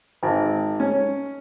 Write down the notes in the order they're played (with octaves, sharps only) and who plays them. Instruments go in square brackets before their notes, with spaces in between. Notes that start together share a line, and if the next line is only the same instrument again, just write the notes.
[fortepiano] G#1
C#4